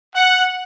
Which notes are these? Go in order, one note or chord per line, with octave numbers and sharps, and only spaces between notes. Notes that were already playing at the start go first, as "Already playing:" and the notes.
F#5